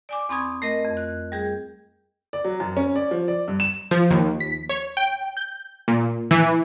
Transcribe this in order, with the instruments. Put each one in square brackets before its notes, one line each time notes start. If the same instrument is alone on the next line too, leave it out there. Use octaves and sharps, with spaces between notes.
[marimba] D5 G#5 D6
E2 C4 B5 C#6 D#6 G#6
A3 A#4 D#5
F2
F#6
G3 G#4 G6
[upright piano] D5
F#3
F#2
C#4
D5
F3
D5
G2
E7
[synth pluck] F3
D#2
B6
C#5
G5
G6
A#2
E3